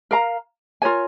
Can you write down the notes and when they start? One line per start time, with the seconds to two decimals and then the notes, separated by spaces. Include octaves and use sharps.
0.11 A#4 F5 A#5
0.82 F4 A#4 C#5 G#5